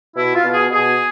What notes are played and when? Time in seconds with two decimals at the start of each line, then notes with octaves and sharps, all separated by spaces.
0.16 B2 E4
0.35 F4
0.44 B2
0.53 G#4
0.71 B2 G#4